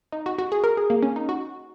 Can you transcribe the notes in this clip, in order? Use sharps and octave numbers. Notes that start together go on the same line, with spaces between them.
D#4
F#4
F#4
G#4
A#4
G#4
A#3
C#4
D#4
F#4